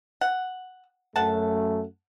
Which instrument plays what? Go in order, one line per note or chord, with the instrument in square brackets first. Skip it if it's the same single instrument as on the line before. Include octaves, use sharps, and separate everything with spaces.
[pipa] F#5
[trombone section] F#2 A3 [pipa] F#5 A5